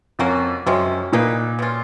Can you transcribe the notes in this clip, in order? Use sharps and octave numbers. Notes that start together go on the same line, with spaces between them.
F2 A#3 C#4 F#4
F#2 C3 F3 G#3 C#4
A#2 A#3 D#4 G#4 B4
B2 G#3 C#4 F4